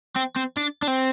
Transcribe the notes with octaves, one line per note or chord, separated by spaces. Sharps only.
C4
C4
D4
D4
C4